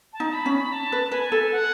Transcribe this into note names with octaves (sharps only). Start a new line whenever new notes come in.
A5
D#4
B5
C#4
B5
A5
B4
B4 G#5
A4
F#5